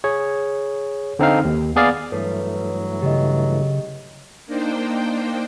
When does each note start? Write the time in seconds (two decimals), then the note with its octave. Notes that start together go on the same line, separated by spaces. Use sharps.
0.04 G#4 C#5
1.19 D3 C4 D#4 F5
1.45 D#2
1.76 B3 G#4 D5 F5
2.12 G2 E3 F#3 A3 A4 B4 C#5
3.02 C#3 G4 D#5
4.46 A#3 D4 D#4 C5 G5